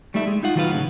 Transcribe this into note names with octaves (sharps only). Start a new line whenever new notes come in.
G3 A3 D#4 E4 E5
G#3
D#4 F4 F#5
D#3 F#3 F4 G#4 B4 F5
A2 C#3 F#3